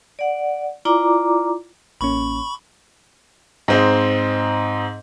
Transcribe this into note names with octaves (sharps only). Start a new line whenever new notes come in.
D5 F#5
E4 F4 D5 A#5 D6
A1 A#3 C#4 B5 C#6
G#2 C4 D#4